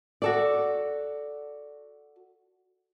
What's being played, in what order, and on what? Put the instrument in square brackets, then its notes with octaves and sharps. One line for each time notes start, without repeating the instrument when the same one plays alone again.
[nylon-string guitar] F#4 A4 D5